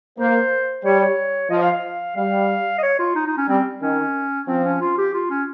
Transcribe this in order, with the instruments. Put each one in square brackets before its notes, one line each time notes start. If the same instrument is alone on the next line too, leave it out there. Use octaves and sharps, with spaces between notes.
[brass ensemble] A#3 [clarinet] C5
[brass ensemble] G3 [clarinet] C#5
[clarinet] C#5
[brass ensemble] F3 [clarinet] D#5
[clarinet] F5
F5
[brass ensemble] G3 [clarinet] F5
[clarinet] D#5
C#5
F4
D#4
D#4
C#4
[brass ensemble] G3 [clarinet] C4
[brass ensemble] D#3 [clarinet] C#4
[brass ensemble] F3 [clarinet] C4
[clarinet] C#4
F4
G4
F4
C#4